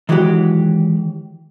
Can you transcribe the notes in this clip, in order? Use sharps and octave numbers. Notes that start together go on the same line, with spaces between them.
D#3 E3 F#3 G#3 F#4 G4